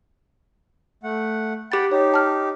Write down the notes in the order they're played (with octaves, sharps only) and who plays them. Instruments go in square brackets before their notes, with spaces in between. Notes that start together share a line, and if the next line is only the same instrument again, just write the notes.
[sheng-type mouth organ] A3 F#5
[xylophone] G4 A6 [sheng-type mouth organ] F#5 G5 B5
[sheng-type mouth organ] D#4 G4 [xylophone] C#5
[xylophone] A5 F6